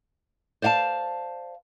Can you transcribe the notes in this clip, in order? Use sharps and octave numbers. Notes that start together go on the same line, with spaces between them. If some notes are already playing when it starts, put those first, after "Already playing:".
C5 D5 F5 F#5 A5